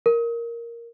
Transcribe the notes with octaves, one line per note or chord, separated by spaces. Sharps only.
A#4